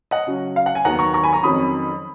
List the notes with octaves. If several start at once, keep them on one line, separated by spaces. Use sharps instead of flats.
D#5 F#5
C#3 F#3 C#4
F5
F#5
G#5
D#2 D#3 F#3 B3 F#5 A#5
A#5 C#6
A#5 C#6
G#5 B5
A#5 C#6
F2 D#3 F#3 C#4 B5 D#6